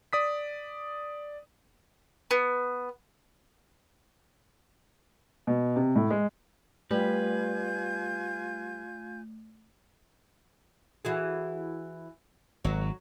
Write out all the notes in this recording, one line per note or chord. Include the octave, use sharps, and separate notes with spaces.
D5 D#6 B6
B3
B2
C3
A2
G#3
G3 A3 F4 B4 G#5 G6
E3 F#4 G#4
G#1 F#3